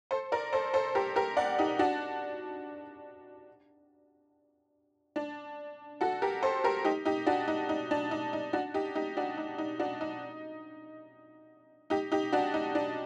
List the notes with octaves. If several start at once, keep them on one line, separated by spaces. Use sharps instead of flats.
A4 C5
A#4 D5
A4 C5
A4 C5
G4 A#4
G4 A#4
D5 F#5
D#4 G4
D4 F#4
D4
F#4 A4
G4 A#4
A4 C5
G4 A#4
D#4 G4
D#4 G4
D4 F#4
D#4
D#4
D4
D#4
D#4
D4 F#4
D#4 G4
D#4 G4
D4 F#4
D#4
D#4
D4 F#4
D#4
D#4 G4
D#4 G4
D4 F#4
D#4
D4